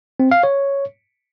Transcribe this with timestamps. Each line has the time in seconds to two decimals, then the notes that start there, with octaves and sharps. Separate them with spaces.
0.20 C4
0.31 F5
0.43 C#5